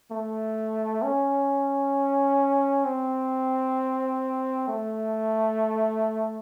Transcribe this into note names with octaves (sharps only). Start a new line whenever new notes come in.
A3
C#4
C4
A3